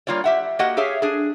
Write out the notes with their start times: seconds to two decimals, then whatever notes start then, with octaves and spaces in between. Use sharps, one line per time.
0.07 G3 A#3 F4 C#5 D5
0.24 G4 E5 F#5
0.59 A#3 F#4 G4 D#5 F#5
0.77 G4 G#4 C#5 E5 F5
1.02 D4 G#4